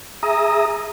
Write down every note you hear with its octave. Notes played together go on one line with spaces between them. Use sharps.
G#4 E5 A#5 D#6